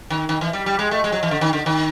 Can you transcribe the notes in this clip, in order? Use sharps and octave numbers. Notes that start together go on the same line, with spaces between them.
D#3
D#3
E3
G3
G3
G#3
A3
G#3
F#3
E3
D3
D#3
D3
D#3